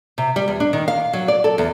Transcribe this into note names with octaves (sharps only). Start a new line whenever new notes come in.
C3
G3
E2
D4
D#3
F5
F#3
D5
A4
E2